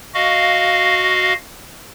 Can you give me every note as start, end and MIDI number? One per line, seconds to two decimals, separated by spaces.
0.14 1.33 66
0.14 1.33 75
0.14 1.33 77